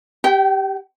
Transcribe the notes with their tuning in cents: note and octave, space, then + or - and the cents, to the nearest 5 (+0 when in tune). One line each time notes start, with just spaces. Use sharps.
G4 +0 G5 -35